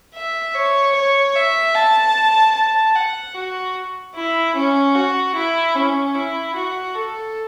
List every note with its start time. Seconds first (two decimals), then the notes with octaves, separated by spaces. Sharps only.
0.15 E5
0.55 C#5
0.95 C#5
1.35 E5
1.75 A5
2.54 A5
2.95 F#5
3.35 F#4
4.15 E4
4.55 C#4
4.95 F#4
5.35 E4
5.75 C#4
6.15 E4
6.55 F#4
6.95 A4